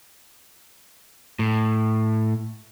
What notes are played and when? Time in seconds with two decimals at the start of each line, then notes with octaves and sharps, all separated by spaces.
1.39 A2